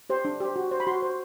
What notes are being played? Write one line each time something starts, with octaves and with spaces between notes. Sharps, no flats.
G4 C5
D4
G4 C5
F#4
C5
B5
F#4 C6
C5